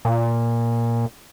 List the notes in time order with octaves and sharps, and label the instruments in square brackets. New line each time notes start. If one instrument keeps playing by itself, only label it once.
[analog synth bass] A#2